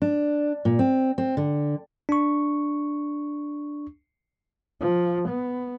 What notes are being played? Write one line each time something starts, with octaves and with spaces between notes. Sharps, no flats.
D4
A#2
C4
C4
D3
D4 C#6
F3
B3